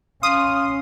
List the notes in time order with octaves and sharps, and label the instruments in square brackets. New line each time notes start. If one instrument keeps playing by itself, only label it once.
[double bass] C#4 [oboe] F5 [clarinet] C6 [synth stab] D#6